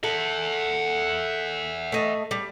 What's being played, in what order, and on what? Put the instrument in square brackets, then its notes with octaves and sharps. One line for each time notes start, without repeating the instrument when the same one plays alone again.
[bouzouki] A4 [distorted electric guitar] E5 F#5
[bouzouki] A3 D#5 A5
G3